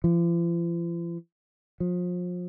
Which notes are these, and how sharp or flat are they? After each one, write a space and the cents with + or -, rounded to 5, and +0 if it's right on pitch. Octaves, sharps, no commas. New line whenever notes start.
F3 -45
F3 +35